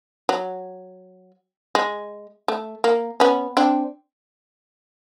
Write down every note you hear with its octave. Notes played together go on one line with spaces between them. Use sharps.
F#3
G#3
A3
A#3
B3 C#4
C4 D4